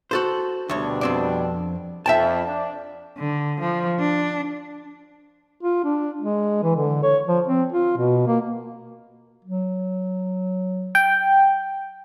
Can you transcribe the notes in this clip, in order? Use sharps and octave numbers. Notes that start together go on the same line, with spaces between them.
F#4 A4 C5
D2 B2 G3 D4 C#5
F2 C4 D5
F2 E5 G5 A5
D4
D3
F3
D4
F4
D4
G#3
E3
D3
C#5
F3
C4
F4
B2
A#3
F#3
G5